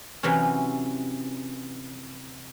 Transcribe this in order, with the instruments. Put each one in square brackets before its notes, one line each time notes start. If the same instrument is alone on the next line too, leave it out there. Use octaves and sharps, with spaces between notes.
[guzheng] C3 E3 F#3 C#4